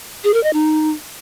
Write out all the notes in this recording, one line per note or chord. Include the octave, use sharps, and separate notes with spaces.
G#4
A#4
D#5
D#4